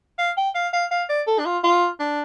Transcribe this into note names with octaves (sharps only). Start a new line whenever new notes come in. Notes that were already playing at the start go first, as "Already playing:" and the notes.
F5
G5
F5
F5
F5
D5
A4
D4
F4
F4
D4